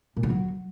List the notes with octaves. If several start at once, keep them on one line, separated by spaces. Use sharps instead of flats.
A#2
D3
F#3